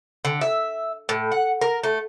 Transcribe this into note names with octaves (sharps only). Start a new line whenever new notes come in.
D3
E5
A2
F#5
A#4
A3